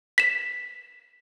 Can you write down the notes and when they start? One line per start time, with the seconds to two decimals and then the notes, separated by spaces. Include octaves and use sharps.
0.18 B6 E7